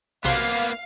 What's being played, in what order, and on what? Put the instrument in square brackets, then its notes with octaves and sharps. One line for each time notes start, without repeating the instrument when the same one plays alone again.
[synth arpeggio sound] B1 C3 C5 [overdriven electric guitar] A#3 B3 [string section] F5